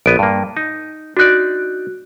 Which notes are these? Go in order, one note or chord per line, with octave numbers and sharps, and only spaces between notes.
A#1 B3 D7 D#7
G2 A#3
D#4
D4 D#4 F#4 D5 F#6